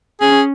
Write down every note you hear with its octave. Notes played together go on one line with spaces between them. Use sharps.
C#4 G#4